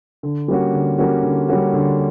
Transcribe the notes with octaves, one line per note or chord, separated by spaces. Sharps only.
D3
G3 A#3 C#4 F#4
D3
G3 A#3 C#4 F#4
D3
G3 A#3 C#4 F#4
D3